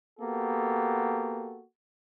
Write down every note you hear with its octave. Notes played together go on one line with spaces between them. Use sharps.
A#3 B3 F#4 G4 A4